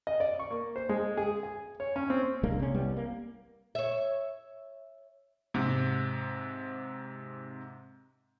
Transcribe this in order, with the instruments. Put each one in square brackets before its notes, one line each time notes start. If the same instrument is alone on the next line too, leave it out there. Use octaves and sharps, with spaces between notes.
[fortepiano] D#5
D5
C#6
A#3
C5
G#3
G#4
G#5
C#5
C#4
C4
[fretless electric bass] C2 G#3 A#3 D4
C3 C#4
C2 G3 B3
A#3
[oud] C#5 E5
[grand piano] G#2 C3